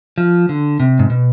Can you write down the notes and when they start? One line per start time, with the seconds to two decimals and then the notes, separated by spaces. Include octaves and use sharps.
0.18 F3
0.49 D3
0.80 C3
0.99 G#2
1.10 B2